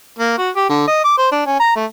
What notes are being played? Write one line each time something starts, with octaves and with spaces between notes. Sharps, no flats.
A#3
F#4
G4
D3
D#5
D6
C5
D4
C#4
A#5
A3